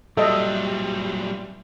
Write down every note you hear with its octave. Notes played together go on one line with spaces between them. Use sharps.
A#2 F#3 G3 A4 D#5 E5